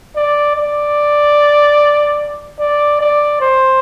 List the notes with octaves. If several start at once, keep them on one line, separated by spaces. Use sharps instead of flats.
D5
D5
D5
D5
C5